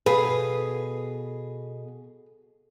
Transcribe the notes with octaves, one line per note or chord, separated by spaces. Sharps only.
B2 G#4 A4 B4 F5